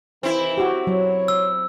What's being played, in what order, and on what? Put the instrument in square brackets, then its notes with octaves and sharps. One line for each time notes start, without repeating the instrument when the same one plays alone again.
[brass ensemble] C3 D#3 E3 [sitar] C4 E4
[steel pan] F#4 G4
[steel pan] F#3 [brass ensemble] C#5
[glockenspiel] E6